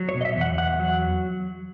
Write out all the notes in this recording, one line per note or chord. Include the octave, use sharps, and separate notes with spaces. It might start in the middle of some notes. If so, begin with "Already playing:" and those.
Already playing: F#3
C#5
B2
D#5
E5
E2
F#5
E2 F#5
F#3